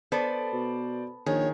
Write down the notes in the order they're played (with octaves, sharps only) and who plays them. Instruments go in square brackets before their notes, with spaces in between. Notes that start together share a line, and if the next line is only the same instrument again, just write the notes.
[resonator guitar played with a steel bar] B3 A4 B4 [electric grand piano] C5 D5
[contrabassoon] B2
[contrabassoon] A#1 [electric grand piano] D#3 [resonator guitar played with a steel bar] G#4 [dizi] C#5